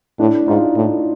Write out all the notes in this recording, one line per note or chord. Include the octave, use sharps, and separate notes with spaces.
A2 D4 E4
G#2 D#4 F4
A2